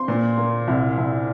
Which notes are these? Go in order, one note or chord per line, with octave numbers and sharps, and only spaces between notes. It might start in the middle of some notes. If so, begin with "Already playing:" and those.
Already playing: C4 C6
A#2
A#3
C2
C2